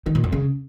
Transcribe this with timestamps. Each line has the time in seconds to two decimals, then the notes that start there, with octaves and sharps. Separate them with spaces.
0.06 D#3
0.15 A#2
0.24 F2
0.32 C#3